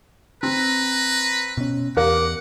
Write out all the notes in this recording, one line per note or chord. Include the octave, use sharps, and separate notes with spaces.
C4 B4 A#5
B2 C#4
E2 G4 A#4 F5 F#5 D6